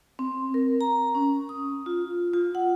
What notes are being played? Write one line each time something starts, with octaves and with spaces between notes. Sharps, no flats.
C4
A#4
A#5
C#4
D#6
F4
F4
F#5